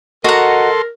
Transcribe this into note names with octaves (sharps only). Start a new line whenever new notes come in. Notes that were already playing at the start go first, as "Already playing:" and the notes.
F#4 A4 A#4 D#5 F#5 A#5 C6